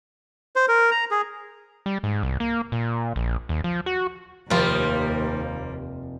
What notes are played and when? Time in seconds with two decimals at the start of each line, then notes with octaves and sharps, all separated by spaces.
0.56 C5
0.68 A#4
0.91 A#5
1.11 G#4
1.86 G3
2.04 G#2
2.23 C2
2.40 A#3
2.72 A#2
3.16 A#1
3.49 D#2
3.64 F3
3.86 F#4
4.50 F1 D#2 C3 F3 G3 A#3 F4